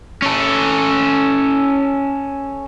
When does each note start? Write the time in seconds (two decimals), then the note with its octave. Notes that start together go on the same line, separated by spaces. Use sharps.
0.22 C#4 A4